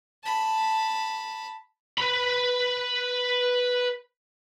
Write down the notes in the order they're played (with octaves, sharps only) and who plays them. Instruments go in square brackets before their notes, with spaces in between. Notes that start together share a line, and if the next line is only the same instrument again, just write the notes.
[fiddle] A5 B5
[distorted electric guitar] B4 B5